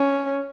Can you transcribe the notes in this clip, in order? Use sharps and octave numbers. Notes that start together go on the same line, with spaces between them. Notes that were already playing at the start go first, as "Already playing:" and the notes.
Already playing: C#4